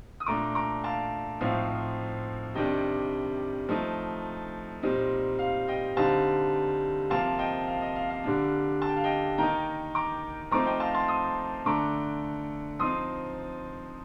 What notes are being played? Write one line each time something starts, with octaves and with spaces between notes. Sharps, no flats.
D#6
A#2 A3 D4 A#5 D6
A#5 D6
F5 A5
A2 F3 C4 D#4 F5
C3 D#3 G3 D4 D#5 G5
F3 A3 D#4
A#2 G3 C4 D#4
F5
D#5 G5
D3 G3 C4 D#4 F5 A5
C3 F3 A#3 F5 A5
D#5 G5
F5
D#5
F5
F5
D3 G3 A#3 D4
A5
G5
F5
D#5 G5
D#3 A#3 D#4 G5 A#5
A#5 D6
F3 A3 C4 D#4 A#5 D6
D#5 G5
F5 A5
A5 C6
C6 D#6
D3 A3 D4 A#5 D6
F3 C4 D#4 C6 D#6